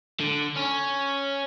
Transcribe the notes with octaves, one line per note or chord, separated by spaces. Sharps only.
D3
C#4